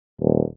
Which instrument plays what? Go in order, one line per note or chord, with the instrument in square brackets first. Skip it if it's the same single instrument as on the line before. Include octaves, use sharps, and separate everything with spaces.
[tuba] D#1